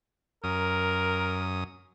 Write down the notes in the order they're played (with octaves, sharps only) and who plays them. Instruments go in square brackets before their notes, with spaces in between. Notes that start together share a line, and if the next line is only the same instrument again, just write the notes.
[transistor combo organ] F#2 D#6 [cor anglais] A#4